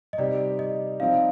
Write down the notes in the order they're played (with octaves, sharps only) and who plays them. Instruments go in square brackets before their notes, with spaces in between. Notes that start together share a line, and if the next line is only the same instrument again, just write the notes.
[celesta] D#5
[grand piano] C3 G3 C4 D#4 G4 [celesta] D5
[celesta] D#5
[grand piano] F3 C4 D#4 [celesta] F5